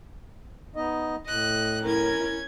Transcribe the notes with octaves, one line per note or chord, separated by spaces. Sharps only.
B3 D#4 D#5
A2 D#5 F#6
C#4 E4 A#4 G#6